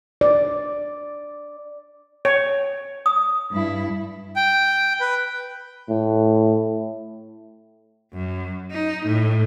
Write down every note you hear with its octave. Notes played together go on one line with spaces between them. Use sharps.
D5
C#5
D#6
G2 E4
G5
B4
A2
F#2
D#4
A2